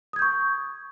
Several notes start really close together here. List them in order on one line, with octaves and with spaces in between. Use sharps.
D#6 G#6 G6 C#6